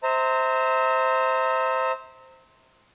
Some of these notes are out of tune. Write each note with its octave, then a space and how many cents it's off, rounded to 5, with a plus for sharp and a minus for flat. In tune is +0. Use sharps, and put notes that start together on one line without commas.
C5 +0 E5 -35 A#5 -25